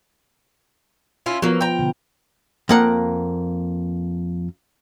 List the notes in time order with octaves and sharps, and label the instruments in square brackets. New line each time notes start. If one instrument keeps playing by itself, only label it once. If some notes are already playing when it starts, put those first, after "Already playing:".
[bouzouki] C#4 E4 F4
[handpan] F3 B3 F4 [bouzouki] F#3 A#3
[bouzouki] G5 A#5
[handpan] B2 D3
[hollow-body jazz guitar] F2 A#3 F#5